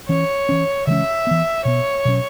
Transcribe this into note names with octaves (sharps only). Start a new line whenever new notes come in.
E3 C#4 C#5
E3 C#4
C#3 E3 G#3 C#4 E5
E3 B3
B2 B3 C#5
B2 F#3 C#4